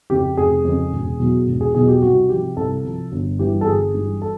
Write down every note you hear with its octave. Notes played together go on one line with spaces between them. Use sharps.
F2 C#3 G4
F1 G#4
F2 C#3
E1
E2 B2 F#3
E1
G#4
E2 B2 F#3 G#4
G4
C2 F#4
C3 F3 G4
C2 A4
C3 F3
G1
G2 E3 G3 G4
A4
G1 G#4
G2 E3 G3
A4